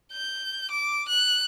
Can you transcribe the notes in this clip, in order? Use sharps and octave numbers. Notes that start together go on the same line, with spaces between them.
G6
D6
F#6